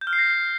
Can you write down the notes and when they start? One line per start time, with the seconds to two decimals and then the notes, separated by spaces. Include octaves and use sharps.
0.01 G6
0.07 F6
0.13 C7
0.18 A#6